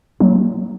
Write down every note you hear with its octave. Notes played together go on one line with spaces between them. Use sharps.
F#3 A#3